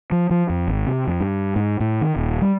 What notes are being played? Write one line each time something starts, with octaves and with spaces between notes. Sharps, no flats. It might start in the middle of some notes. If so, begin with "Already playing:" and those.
F3
F3
F2
G#1
C3
F2
G2
G#2
A2
D#3
D#1
G3